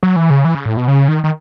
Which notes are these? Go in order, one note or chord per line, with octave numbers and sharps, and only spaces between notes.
F#3
E3
C#3
E3
C#3
A2
B2
C#3
D#3
D#3